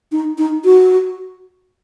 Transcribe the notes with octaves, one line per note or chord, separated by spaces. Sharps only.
D#4
D#4
F#4